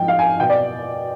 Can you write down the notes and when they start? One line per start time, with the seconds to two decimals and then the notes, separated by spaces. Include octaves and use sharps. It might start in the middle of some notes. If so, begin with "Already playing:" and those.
Already playing: G#2 F3 G5
0.08 F5
0.19 G#5
0.40 B2 G5
0.50 D5